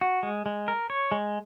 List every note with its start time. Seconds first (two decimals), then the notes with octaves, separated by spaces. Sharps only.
0.01 F#4
0.23 G#3
0.46 G#3
0.68 A#4
0.90 C#5
1.12 G#3